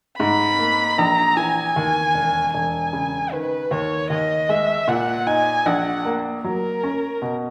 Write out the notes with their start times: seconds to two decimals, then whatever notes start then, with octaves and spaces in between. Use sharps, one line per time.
0.20 G#2 B5
0.59 A#3
0.98 A#1 A#5
1.37 E3 G#5
1.76 D#2
2.14 E1
2.54 E1 G#5
2.93 C#3
3.32 D#3 B4
3.71 D#2 C#5
4.10 D#2 D#5
4.49 G#3 E5
4.88 A#2 F#5
5.27 D#4 G#5
5.66 A#1 F#5
6.05 A#3
6.44 F#3 A#4
6.83 C#4
7.22 B2